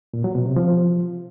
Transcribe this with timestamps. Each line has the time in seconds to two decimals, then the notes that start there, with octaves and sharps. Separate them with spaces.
0.14 A#2
0.24 F#3
0.35 B2
0.46 C3
0.56 F3